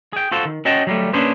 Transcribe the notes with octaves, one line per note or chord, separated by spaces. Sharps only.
G#4 G5
F4 F#4 A4 C5
D#3
C#4 F#4 D#5 G5 A5
F#3 G3 A3
A#3 C#4 D4 G#4 B4 C5